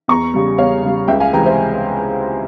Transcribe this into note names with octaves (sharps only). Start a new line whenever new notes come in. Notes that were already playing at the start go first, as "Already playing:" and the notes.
E2 A#5 C#6
C#3 G3
E2 C#5 F5
C#3 G3
C#2 E5 G5
F5 G#5
C3 E3 G#3 G5 A#5
C5 E5